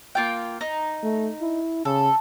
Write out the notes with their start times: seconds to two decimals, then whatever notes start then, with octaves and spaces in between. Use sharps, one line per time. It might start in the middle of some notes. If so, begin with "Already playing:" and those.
0.15 A#3 F4 G5
0.61 D#4
1.03 A3
1.42 E4
1.85 C#3 A4